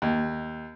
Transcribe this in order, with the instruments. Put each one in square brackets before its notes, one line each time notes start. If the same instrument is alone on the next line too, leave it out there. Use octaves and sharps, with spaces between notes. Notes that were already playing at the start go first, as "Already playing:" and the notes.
[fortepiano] D#2